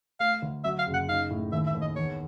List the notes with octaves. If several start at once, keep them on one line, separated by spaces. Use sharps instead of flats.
A3 F5
D2
F#3 E5
F5
F#1
F#5
D#4 F5
A2
D#2 E5
E5
D#2
D#5
E2 C#5